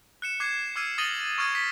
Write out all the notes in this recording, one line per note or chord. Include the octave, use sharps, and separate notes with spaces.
F#6 C#7 E7
D6 F#6 G#6 C7 C#7
D6 E6 F6 G#6 C7 D#7
D#6 A6 A#6 D#7 F#7 G7
C#6 D#6 F6 G#6 A#6 D#7
B6 C7